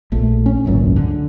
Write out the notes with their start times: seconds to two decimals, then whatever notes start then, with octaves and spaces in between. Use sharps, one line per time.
0.12 A#1 A3
0.46 C#4
0.65 G#1 C#2 F#2 A#2
0.96 D3